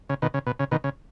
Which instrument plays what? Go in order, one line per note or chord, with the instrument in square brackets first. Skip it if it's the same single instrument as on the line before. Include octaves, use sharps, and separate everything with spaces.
[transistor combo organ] C#3
B2 D#3
C#3
B2
C#3
B2 D#3
C#3